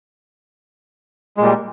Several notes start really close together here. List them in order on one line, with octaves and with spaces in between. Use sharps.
G#3 A#2 G3